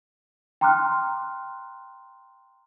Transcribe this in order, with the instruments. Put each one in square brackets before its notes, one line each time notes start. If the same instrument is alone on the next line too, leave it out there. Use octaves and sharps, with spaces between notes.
[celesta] G5 A#5 C6 D6 F6 F#6